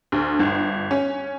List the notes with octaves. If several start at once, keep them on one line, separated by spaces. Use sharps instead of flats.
D2
G1
C#4